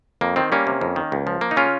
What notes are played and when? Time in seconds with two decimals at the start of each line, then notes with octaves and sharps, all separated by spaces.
0.21 F2 A#3
0.36 D#3 C4
0.52 G3 A#3 C#4
0.67 C3
0.81 F2
0.96 D#3
1.12 C#2
1.27 F3
1.41 A#3
1.51 D#4
1.56 C#3 C#4 F4